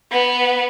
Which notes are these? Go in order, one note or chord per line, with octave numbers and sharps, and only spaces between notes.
B3